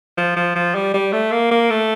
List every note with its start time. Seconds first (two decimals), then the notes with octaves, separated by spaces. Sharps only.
0.18 F3
0.36 F3
0.56 F3
0.75 G3
0.94 G3
1.13 A3
1.32 A#3
1.51 A#3
1.70 A3